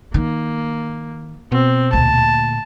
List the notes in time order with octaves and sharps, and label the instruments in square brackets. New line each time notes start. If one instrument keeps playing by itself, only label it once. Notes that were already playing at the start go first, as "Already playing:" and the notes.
[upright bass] D#3 [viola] A#3
[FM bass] B2 [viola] C4
[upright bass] D2 A#2 [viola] A5